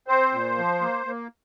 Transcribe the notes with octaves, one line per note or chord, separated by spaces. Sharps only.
C4 C5
A#2
F3
A#3
A#3